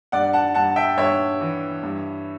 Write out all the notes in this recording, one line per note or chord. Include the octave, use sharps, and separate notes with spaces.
G2 D5 F#5
F#5 A5
G2 F#5 A5
E5 G5
G2 C#5 E5
E3
G2